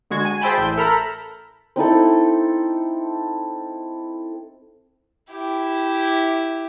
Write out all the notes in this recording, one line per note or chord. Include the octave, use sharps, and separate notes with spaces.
D3 G#3 F#4 G#6
G#5
G#4 C5 E5 G5 A5 B5
A1 E5 G6
A4 A#4 A#5 B5
C4 D#4 E4 A4
E4 G4